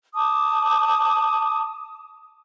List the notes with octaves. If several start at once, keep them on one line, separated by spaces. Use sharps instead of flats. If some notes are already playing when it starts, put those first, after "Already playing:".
A5 D6 D#6